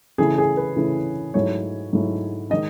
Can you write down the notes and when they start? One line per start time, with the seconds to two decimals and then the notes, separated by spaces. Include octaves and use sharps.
0.18 C#3 E3 A3 E4 G#4
0.38 G#4
0.57 B4
0.76 C#3 E3 A3 E4
1.34 G#2 F#3 A3 E4 C#5
1.93 G#2 F#3 A3 E4
2.50 D#3 G#3 D#4 D#5